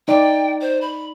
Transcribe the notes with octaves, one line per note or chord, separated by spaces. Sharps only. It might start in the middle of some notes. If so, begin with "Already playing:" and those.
D#4 D5 G5
C5
B5